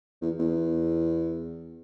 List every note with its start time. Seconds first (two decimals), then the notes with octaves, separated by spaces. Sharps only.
0.22 E2
0.39 E2